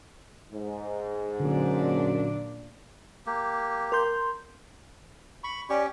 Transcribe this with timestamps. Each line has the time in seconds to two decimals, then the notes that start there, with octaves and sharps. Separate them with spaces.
0.52 G#2
1.40 F#2 A#2 D3 D4
3.26 A#3 G4
3.92 A#4 C6 G6
5.44 B5 C#6
5.70 C#4 G4 D5 C#6